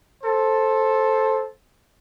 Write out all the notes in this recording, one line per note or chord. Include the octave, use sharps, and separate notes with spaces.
A4 C5